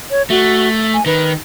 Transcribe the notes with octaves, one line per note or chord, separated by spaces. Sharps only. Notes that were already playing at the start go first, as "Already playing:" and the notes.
C#5
A3 F#4
G#5
D#3 B4